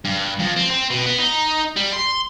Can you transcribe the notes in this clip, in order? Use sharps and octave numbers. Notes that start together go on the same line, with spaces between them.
G2
F2
C4
C4
B2
B3
D#4
G3
C6